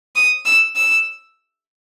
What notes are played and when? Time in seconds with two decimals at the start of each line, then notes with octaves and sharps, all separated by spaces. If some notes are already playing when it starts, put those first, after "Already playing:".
0.16 D#6
0.46 E6
0.76 E6